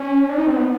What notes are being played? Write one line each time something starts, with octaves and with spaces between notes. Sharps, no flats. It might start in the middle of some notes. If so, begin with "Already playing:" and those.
Already playing: C#4
D4
D#4
C4
B3